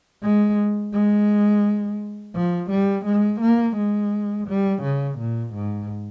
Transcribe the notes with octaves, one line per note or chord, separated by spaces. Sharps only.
G#3
G#3
F3
G3
G#3
A#3
G#3
G3
C#3
A#2
G#2